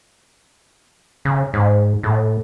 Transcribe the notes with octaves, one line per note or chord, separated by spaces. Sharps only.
C#3
G#2
A2